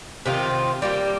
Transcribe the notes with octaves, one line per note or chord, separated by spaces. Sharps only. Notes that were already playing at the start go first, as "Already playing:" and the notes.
C3 D#3 C4 F4
G3 A#3 G4